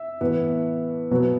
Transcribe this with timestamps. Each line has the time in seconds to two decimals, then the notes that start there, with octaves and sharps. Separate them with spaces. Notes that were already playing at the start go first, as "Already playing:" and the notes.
Already playing: E5
0.21 A2 E3 B3
1.11 B2 F#3 B3